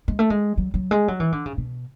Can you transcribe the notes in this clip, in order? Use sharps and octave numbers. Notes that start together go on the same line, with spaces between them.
G#3
A3
G#3
F#3
F#3
G#3
F#3
E3
D3
C#3
B2